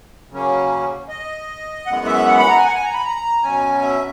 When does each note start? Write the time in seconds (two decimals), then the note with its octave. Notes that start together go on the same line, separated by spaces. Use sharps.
0.30 C#3 F#3 A#3 C#4
1.09 D#5
1.86 F#2 E3 G#3 B3 F#5
2.06 E5
2.26 F#5
2.39 B5
2.48 A#5
2.57 G#5
2.65 F#5
2.75 G#5
2.84 A#5
2.94 B5
3.04 A#5
3.43 B2 F#3 C#4 G#5
3.82 E5